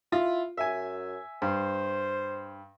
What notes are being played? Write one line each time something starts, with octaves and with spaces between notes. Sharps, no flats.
E4 F4
F#2 E5 G#5
G2 C5